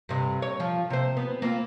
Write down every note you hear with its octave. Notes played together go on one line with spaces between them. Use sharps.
G2 C3
C#5
F3
C3 C5
B3
A#3 C4 F4